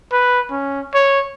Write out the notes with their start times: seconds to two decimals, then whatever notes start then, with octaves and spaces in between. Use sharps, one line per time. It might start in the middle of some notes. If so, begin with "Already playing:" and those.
0.12 B4
0.51 C#4
0.94 C#5